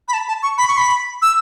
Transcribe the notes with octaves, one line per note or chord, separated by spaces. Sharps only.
B5
A5
A5
C#6
B5
C#6
B5
E6